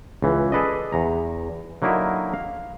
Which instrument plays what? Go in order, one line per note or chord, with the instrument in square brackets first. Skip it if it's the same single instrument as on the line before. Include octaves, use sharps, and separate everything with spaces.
[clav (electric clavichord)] C#2 E3
G#4 A4 B4 D5 D#5
E2 A#5
D3 F#3 A#3 D#4 E4 A#4
F5